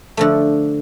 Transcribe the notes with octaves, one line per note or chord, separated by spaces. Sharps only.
D3 F3 A3